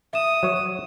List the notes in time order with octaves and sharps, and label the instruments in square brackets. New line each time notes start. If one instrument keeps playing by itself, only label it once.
[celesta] E5 E7 [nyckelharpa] D#6
[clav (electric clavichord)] F#3 C#5